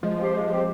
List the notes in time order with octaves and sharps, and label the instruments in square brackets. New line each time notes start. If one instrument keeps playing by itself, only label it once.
[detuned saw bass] F3 [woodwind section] G#3
[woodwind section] C4 G4 C5
G#3
C4 G4 C5